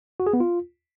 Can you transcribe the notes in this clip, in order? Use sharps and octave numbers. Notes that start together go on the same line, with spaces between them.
F#4
G#4
B3
F4